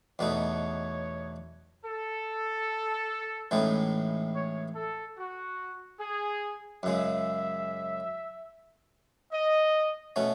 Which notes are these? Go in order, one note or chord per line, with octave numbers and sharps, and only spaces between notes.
E2 B2 A3 D#4 C#5
A4
A1 A2 E3 G#3 D#4
C#5
A4
F#4
G#4
F#2 C#3 G#3 E5
D#5
B2 A3 C#4